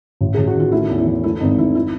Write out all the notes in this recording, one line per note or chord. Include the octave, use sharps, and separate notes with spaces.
A1
A1 G#4
F#4
D#3 F4
A3 E4
E2
E4
E3
A3 E4
G#1 D#4
E3 E4
E4